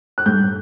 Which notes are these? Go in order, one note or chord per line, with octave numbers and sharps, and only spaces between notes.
F#6
G2 G6